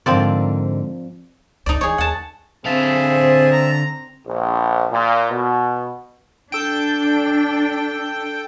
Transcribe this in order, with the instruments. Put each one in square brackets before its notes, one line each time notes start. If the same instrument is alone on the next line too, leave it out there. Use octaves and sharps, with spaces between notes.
[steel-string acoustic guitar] G#2 D3 A#4 [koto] F3 C4 D5
[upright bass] G1 C#2 [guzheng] D#4 D5
[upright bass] E3 [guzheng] G#4 C#5
[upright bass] D#2 [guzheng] F#5 A5
[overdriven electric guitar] D3 F5 [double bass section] C4 [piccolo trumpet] G#4 [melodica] E5 A5
[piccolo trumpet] A#5
[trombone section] A#1
A#2
B2
[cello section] D4 [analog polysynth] A4 G5